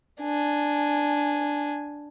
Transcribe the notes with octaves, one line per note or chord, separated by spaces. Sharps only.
D4 G#5